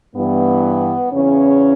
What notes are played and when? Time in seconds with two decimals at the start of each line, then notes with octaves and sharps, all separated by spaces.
0.16 G2 E3 B3
1.12 E2 C#3 E3 C#4